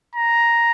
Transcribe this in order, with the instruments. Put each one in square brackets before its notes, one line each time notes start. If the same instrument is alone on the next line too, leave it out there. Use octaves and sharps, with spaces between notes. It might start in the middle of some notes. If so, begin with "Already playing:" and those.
[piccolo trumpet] A#5